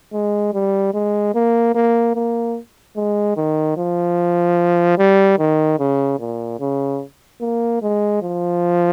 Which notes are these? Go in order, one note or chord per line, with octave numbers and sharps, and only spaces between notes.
G#3
G3
G#3
A#3
A#3
A#3
G#3
D#3
F3
G3
D#3
C#3
A#2
C#3
A#3
G#3
F3